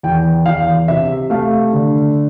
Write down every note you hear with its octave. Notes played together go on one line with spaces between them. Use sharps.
E2 G5
E2 F5
C3 E5
A3 F5
D3